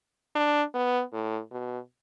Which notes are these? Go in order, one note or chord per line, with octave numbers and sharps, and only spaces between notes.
D4
B3
A2
B2